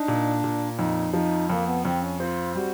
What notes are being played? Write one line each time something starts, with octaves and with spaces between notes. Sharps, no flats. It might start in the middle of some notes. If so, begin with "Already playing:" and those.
Already playing: D4 D#4
A#2
A#2
F2 D#4
F3 D#4
F2 A#3
B3
F2 C4
C#4
C4 F4
G3 F#4